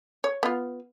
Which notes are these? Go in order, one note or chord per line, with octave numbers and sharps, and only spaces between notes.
C#5
B3 F4